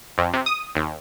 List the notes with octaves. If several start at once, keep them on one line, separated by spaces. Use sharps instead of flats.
F2
C3
D#6
D#2